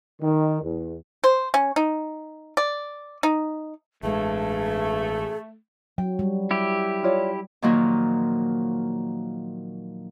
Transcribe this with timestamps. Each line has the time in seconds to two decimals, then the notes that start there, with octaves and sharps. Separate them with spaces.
0.22 D#3
0.62 E2
1.24 C5
1.54 C#4
1.76 D#4
2.57 D5
3.23 D#4
4.03 A1 G2 G#3 A3 G#4
5.98 F#3 G5
6.19 G3
6.51 E4 G4
7.03 F4 C#5 D5
7.62 A#2 D#3 F3 F#3 A#3